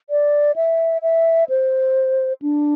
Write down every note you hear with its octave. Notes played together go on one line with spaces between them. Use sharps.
D5
E5
E5
C5
D4